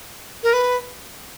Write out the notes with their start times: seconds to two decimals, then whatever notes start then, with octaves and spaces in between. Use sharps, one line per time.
0.43 A#4
0.53 B4